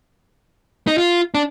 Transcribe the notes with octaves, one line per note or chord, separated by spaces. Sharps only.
D#4
F4
D4